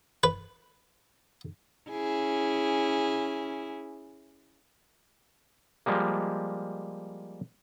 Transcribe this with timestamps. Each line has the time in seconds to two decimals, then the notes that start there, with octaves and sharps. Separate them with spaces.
0.24 B4
1.90 C#4 E4 G#4
5.86 F3 G3 G#3 A#3